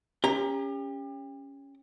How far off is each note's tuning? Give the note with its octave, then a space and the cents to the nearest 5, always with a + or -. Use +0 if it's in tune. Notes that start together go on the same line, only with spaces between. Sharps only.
C#4 +0 G4 +35 A#5 +0